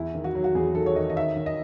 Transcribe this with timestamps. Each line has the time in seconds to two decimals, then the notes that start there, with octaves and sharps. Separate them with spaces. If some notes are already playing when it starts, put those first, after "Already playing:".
Already playing: E2 E4
0.15 D#3
0.24 F#4
0.35 F#3
0.44 F#4
0.55 E2 G#4
0.75 D#3 A4
0.86 C#5
0.96 D#3 D#5
1.10 D#5
1.16 D#3 E5
1.36 D#3
1.46 D#5